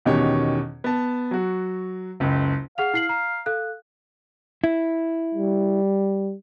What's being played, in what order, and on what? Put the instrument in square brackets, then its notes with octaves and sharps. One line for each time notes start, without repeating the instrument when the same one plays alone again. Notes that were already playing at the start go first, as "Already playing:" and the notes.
[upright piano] E2 B2 D#3 C#4 G4 C#5
B3 A5
F#3 F#4
F#1 C#2
[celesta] G#4 F#5 F7 [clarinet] F5
[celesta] E4 C7 F#7
A#5
A4 F5 F#6
[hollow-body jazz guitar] E4
[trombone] G3